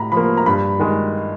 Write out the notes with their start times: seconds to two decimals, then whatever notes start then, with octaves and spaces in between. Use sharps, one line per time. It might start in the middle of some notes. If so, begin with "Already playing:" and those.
Already playing: A2 A#5 B5
0.12 F3 A#3 B5
0.37 A#5
0.46 G2 B5
0.79 D#3 G#3